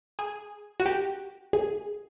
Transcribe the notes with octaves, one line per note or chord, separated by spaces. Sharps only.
G#4
F#4
G4
G#4